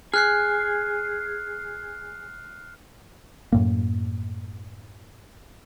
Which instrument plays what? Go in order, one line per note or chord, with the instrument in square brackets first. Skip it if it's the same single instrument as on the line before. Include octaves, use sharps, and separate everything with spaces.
[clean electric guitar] G#4 [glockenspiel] F6 F#6 C7
[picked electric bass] F#2 A2 A#3